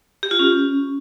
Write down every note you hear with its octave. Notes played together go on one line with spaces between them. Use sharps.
G4
F4
C#4